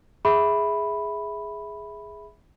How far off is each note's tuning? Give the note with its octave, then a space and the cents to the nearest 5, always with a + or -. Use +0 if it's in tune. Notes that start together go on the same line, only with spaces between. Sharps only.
G#4 +0 E5 -10 B5 +0